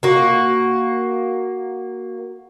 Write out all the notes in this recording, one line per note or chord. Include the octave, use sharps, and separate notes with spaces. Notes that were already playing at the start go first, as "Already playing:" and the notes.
A#3 F#4